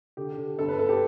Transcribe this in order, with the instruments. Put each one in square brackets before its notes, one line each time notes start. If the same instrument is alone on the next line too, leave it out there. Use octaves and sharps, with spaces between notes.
[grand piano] D3 G4
D3
G1 A4
B4
G1 A4
G4